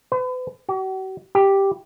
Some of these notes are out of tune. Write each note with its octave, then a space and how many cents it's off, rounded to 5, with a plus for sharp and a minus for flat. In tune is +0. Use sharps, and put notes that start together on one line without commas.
B4 +40
F#4 +45
G4 +0